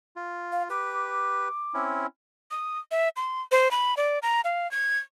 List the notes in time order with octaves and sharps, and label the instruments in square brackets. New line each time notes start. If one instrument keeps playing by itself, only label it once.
[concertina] F4
[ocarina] F5
[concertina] G4 B4 [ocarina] D6
[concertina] C4 C#4 E4
[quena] D#6
E5
C6
C5
B5
D5
A#5
F5
G#6